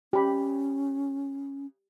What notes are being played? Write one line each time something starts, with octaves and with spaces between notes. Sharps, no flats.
C#4 G4 B5